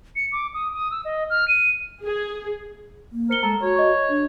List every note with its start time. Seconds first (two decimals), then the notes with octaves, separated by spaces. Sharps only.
0.16 C#7
0.33 D6
0.54 D#6
0.74 D#6
0.91 E6
1.05 D#5
1.30 F6
1.48 D#7
2.03 G#4
3.12 A#3
3.30 A#4 C5 C#7 G7
3.43 G#3 A4 A#5
3.62 F#4 C#5
3.76 D#5 C#6
4.09 D4